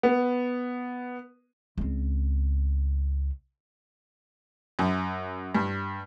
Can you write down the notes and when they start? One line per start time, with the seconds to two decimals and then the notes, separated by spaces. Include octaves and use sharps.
0.03 B3
1.78 C#2 C4
4.79 F#2
5.55 G2